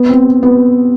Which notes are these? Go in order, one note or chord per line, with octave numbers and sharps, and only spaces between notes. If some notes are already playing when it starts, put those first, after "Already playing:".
Already playing: B3
C4
B3